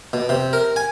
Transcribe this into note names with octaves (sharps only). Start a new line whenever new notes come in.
B2
C3
A#4
G#5